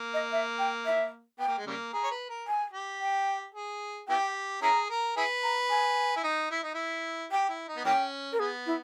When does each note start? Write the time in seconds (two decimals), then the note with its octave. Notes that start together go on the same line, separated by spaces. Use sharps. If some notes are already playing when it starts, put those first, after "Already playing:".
Already playing: A#3
0.14 D#5
0.32 E5
0.58 G5
0.85 E5
1.39 B3 G5
1.48 A#3
1.58 G#3
1.67 C#3 G3 A#3
1.93 G#4 A#5
2.04 C#5
2.11 B4
2.29 A#4
2.47 G#5
2.73 G4
3.01 G5
3.55 G#4
4.08 B3 E4 G4 G5
4.62 C#4 E4 G#4 A#5
4.90 A#4
5.16 E4 G#4 B4 G#5
5.43 A#5
5.70 G#5
6.16 E4
6.24 D#4
6.50 E4
6.63 D#4
6.74 E4
7.31 G4 G5
7.49 E4
7.68 D#4
7.77 B3
7.85 E3 A#3 C#4 G5
8.32 A#4
8.39 B3 G#4
8.66 E4